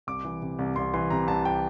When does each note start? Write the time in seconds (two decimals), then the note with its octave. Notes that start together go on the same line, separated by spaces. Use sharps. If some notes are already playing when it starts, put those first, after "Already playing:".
0.07 C2 D6
0.25 E3
0.42 C3
0.59 C2
0.76 C2 C6
0.94 E3 C6
1.10 C3 A#5
1.27 C2 A5
1.45 G5